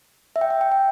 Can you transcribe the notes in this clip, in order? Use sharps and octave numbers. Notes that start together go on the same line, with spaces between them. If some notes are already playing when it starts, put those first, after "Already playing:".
E5
G5
E5
G5
G5